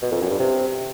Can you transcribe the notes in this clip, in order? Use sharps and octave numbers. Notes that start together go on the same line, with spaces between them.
B2
F2
F#2
G2
C3